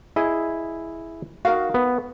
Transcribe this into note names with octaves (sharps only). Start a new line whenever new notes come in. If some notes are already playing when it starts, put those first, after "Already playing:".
E4 G#4 D#5
D#4 F#4 A#4 F5
B3